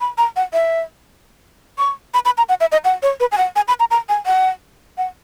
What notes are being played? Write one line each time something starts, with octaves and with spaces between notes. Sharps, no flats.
B5
A#5
F#5
E5
C#6
B5
B5
A#5
F#5
E5
D#5
F#5
C#5
B4
G#5
F#5
G#5
B5
A#5
A#5
G#5
F#5
F#5